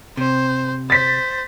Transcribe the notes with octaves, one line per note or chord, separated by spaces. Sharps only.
C3 C5
C5 A6 B6